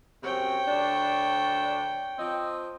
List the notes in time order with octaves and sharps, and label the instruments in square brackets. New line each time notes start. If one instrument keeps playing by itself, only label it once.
[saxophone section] F#2 C3 C4 [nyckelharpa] C#5 G5
[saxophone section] D2 D4
F3 C4 D#5